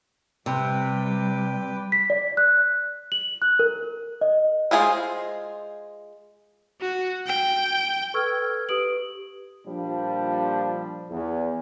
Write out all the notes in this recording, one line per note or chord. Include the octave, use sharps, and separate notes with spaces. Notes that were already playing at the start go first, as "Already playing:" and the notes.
C3 G3 B4 G5 D6
B6
D5
F#6
F#7
F#6
A#4
D#5
G#3 F4 G#4 C5
F#4
G5
A4 B4 C#6 E6 F6 G#6
G4 B4 D#6 D7 F#7
A#2 F3 G3 D4
E2